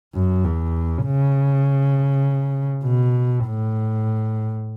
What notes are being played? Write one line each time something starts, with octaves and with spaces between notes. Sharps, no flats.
F#2
E2
C#3
B2
A2